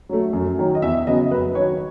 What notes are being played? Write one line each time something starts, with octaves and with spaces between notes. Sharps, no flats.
F#3 A3
F#2
D#3 F#3
D#5
E2 E5
C#3 F#3 B3 D#5
F#2 B4
D#3 F#3 C#5